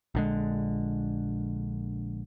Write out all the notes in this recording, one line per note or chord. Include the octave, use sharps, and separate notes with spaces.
A#1 D3 G#3